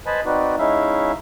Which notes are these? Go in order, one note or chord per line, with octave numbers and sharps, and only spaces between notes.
B4 C5 D#5 G#5 A5 B5
C4 D#4 F#4 B4 D5
G#3 C#4 D#4 E4 E5 F5